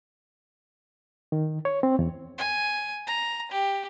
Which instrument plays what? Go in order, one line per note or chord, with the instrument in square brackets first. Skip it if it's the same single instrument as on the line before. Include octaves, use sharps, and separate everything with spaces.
[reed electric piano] D#3
C#5
C4
E2
[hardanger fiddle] G#5
A#5
G4